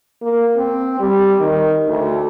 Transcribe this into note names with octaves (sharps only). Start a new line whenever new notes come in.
A#3
C4
G3
D#3
D2